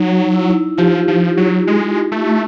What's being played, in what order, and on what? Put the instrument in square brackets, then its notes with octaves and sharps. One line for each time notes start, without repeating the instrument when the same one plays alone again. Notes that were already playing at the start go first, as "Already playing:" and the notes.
Already playing: [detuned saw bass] F#3 [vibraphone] D#4
[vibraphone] E4
[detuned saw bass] F3 [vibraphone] F4 G4
[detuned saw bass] F3
F#3
G#3
A3